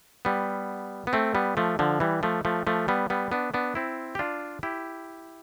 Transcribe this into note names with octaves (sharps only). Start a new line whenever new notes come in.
G3 B3
B3
A3 C4
G3 B3
F3 A3
D3 F3
E3 G3
F3 A3
F3 A3
F3 A3
G3 B3
G3 B3
B3 D4
B3 D4
C4 E4
G4
D4 F4
E4 G4